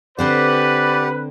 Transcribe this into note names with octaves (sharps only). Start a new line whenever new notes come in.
D3 C4 G4 B4 C5 D5 F#5